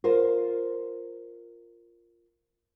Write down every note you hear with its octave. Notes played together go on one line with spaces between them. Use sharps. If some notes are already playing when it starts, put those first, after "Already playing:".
F4 A#4 C5